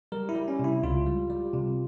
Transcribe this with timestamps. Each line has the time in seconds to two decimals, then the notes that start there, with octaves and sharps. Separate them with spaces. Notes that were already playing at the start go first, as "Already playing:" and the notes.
0.12 G3 A#4
0.29 E4
0.35 G3
0.48 C#4
0.59 C3
0.64 E4
0.83 C#2 F4
1.06 G3
1.30 G3
1.54 C3